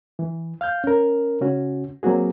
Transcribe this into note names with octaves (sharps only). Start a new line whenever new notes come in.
E3
F5 F6 G6
C#4 A#4
C#3 C#4 F#4
F#3 A#3 C4 F#4 G#4